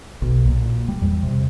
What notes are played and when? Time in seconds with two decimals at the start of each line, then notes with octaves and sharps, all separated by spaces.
0.22 B1
0.45 A#2
0.88 G3
1.02 E2
1.23 C3